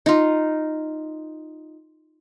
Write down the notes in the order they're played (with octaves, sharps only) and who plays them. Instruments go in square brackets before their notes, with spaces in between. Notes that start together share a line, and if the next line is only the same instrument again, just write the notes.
[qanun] D#4 F4